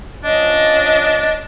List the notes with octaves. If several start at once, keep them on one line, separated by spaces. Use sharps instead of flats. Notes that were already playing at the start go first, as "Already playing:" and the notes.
F3 C#4 D4 C#5 D#5